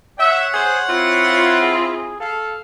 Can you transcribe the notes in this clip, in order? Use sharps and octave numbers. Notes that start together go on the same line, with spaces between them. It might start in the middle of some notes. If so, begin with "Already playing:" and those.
C#5 E5 F#5
G#4 C5
C4 E4 F4
G#4
A4 F5